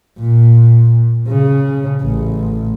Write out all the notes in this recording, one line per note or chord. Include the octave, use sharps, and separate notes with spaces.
A#2
C#3
A1